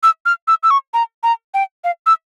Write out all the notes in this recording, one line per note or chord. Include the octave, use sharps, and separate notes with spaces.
E6
F6
E6
E6
C#6
A#5
A#5
G5
F5
E6